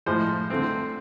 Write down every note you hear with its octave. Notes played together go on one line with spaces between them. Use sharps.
A2 F3 G#3 C5
D3 A3 C4